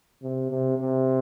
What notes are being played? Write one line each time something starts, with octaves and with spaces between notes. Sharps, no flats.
C3
C3
C3